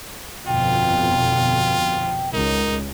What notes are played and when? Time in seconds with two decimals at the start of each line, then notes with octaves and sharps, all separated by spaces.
0.47 G1 F2 B2 F4 G5
2.33 C#2 D#4 A#4